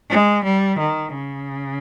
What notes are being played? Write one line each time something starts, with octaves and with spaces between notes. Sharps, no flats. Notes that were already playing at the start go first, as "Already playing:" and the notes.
G#3
G3
D#3
C#3